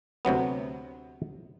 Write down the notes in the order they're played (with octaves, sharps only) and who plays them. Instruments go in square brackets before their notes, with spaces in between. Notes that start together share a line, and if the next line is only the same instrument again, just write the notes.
[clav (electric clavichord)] D2 C3 F#3 B3